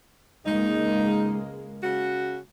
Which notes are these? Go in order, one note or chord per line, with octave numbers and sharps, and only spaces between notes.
C#2 G#3 A#3 D#4
C#3 F#4